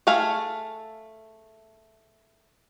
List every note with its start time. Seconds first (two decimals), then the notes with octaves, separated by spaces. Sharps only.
0.07 A3 G#4 A4 F5 G#5